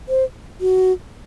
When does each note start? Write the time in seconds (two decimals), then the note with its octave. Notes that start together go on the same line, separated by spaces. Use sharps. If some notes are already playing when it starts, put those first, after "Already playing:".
0.09 C5
0.61 F#4